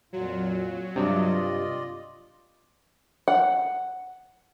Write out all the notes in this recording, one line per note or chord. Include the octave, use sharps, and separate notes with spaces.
F2 A#2 F#3 F4
G2 C3 F4 D5 D#5
F#5